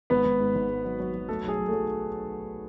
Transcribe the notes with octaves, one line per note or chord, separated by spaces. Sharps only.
G#1 B3 B4
G#1
G#2
G#1
G#2
F#3
F#3
F#3
F#3 A3 A4
B1
G#4
B1
F#3 A3 A4